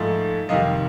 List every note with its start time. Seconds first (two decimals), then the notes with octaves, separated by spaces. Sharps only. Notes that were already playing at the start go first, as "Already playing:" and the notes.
Already playing: G#2 F3 A3
0.49 F2 C3 D#3 G3 D#5 F5